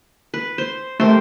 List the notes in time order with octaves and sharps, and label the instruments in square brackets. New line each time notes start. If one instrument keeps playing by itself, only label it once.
[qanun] B4
C5
[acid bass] A3 [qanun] G4 A#4 C5